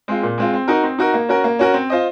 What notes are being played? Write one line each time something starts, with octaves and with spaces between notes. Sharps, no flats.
G#3 C4 F4
A#2
G#3 C4 F4
C4
D#4 F#4 A#4
C4
D#4 F#4 A#4
A#3
C#4 F#4 A#4
A#3
C#4 F#4 A#4
C4
F4 C5 D#5